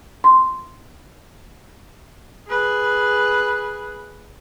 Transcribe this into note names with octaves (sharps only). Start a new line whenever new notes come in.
C6
G#4 B4